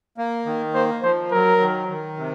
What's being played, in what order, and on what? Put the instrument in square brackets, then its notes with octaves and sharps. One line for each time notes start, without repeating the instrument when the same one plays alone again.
[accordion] A#3
D#3
[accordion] A#3 [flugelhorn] C5
[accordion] F3 [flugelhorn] C5
[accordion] F#3 [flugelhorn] A#4
[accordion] D#3
D#3
C3